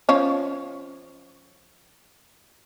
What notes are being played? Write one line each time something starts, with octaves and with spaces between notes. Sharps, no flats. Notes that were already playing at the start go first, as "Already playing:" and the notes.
F3 C#4 C#5